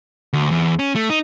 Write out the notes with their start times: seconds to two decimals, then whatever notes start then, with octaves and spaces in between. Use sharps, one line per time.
0.33 D2
0.51 E2
0.79 C#4
0.95 A3
1.10 D#4